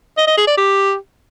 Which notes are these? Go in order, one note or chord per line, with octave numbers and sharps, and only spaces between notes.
D#5
D#5
G#4
D5
G4